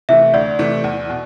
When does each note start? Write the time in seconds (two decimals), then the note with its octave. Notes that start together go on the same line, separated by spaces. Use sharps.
0.09 C3 E3 A3 E5
0.34 D2 D5
0.59 C3 E3 A3
0.84 E2
1.10 B2